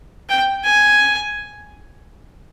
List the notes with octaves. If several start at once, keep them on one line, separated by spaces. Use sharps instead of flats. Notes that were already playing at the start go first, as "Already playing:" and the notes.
G5
G#5